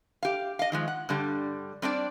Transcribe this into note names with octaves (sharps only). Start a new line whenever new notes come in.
G4 F5
D#5 F5
D#3 F3 G#3
F#5
G2 D3 G3
G3 C4 D4 D5